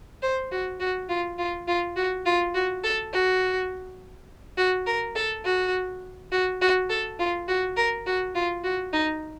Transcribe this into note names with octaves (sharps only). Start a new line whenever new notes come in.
C5
F#4
F#4
F4
F4
F4
F#4
F4
F#4
A4
F#4
F#4
A#4
A4
F#4
F#4
F#4
A4
F4
F#4
A#4
F#4
F4
F#4
D#4